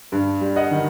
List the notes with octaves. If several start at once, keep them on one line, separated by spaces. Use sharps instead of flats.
G2
G3
D#5 F#5
D#3